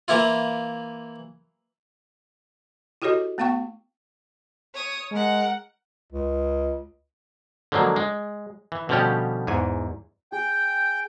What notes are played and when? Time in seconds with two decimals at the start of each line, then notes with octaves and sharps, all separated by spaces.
0.08 E3 A#3 E4 F4
3.02 E4 F#4 G4 A4 C#5 D#5
3.38 A3 B3 F5 G5 C#6
4.74 C#5 D#6
5.12 G#3 A#4 F#5
6.13 C#2
7.72 D3 F3 F#3 G#3 A#3
7.96 G#3
8.72 E3
8.89 B2 D3 F3 G3 C#4 G4
9.47 E2 G#2 G#5
10.32 G#4 G5